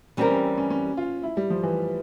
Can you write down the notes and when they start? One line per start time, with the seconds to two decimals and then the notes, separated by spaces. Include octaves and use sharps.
0.17 E3 G3 C4 C#4 G4 A#4
0.31 C#4
0.58 C#4
0.70 C#4
0.97 F4
1.23 E4
1.37 G3
1.50 F3
1.63 E3